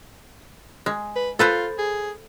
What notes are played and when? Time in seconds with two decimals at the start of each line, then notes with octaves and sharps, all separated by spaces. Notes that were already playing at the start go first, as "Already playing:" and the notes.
0.86 G#3
1.16 B4
1.39 F4 A4 B4 C5
1.78 G#4